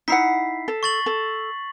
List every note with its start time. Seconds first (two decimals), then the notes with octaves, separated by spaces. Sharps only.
0.08 D#4 E4 F#5 B6 C7
0.68 A4
0.83 C#6 A6 F#7
1.06 A4